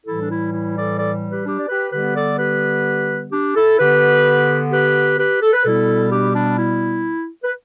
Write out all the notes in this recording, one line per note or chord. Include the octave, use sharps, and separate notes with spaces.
A2 E3 G3 E4 A4
D4
E4
E4
A4 D5
A4 D5
G4 B4
D4 G4
D5
G4 B4
D3 G3 B3 G4 B4
A4 D5
G4 B4
D4 G4
E4 A4
D3 B3 G4 B4
G4 B4
G4 B4
A4
B4
B2 G3 B3 E4 A4
D4 G4
D4
E4
B4